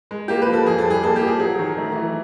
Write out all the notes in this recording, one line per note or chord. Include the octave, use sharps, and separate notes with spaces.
G#3
A#3 G4
B4
F3
A4
F2 G#4
A4
G3
G#4
A#3 A4
G4
F3
G#4
F#3 G#4
D#3
A3
E3